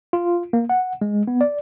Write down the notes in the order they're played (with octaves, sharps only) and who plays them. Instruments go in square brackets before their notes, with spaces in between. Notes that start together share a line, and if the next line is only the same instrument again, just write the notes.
[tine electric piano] F4
A#3
F#5
G#3
B3
D5